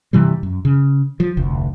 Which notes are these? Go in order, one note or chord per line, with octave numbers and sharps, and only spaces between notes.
G2 C3 E3 G3
F#2
C#3
F3
F1 D2